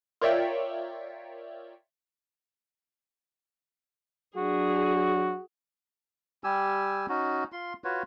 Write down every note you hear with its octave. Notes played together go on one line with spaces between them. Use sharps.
F4 A#4 C#5 D5 E5 G5
F#3 D4 F#4 G#4
G3 G4 G#5 E6
C#4 D#4 F#4
F4 C6
F4 F#4 B4 C#5